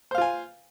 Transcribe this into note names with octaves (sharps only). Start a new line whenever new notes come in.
F4 C5 F5 G#5